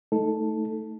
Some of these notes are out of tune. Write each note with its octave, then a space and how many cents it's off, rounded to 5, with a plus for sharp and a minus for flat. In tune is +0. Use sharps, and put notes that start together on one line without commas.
A3 +0 D#4 +25 A4 +0